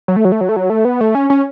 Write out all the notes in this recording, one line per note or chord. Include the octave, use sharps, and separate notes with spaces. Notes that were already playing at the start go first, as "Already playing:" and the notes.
F#3
A3
F#3
A3
F#3
A3
F#3
A3
B3
A3
C#4
C#4